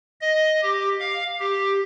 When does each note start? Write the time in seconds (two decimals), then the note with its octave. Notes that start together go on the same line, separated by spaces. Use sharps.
0.21 D#5
0.62 G4
1.00 F5
1.40 G4